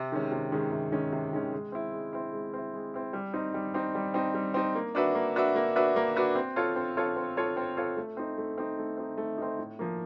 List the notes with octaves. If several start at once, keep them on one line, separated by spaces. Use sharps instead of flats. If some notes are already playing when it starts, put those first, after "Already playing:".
Already playing: C3
D#3 G#3 C#4
C3
D#3 G#3 C#4
C3
D#3 G#3 C#4
C3
D#3 G#3 C#4
G#3
C4 E4
G#3
C4 E4
G#3
C4 E4
G#3
C4 E4
G3
C4 D#4
G3
C4 D#4
G3
C4 D#4
G3
C4 D#4
A#3
D4 F#4 B4 E5
A#3
D4 F#4 B4 E5
A#3
D4 F#4 B4 E5
A#3
D4 F#4 B4 E5
C4
F4 A4 C#5
C4
F4 A4 C#5
C4
F4 A4 C#5
C4
F4 A4 C#5
A3
C4 D#4
A3
C4 D#4
A3
C4 D#4
A3
C4 D#4
A2
F3 A#3